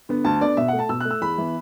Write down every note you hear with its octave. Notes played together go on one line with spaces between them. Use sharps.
D3 B3
D2 A5
D3 B3 D5
B2 E5
F#5
A3
A5
B2 E6
F#6
A3
E6
E2 B5
E3 B3